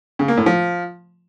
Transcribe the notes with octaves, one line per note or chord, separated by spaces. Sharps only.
C#3
A#3
A2
F3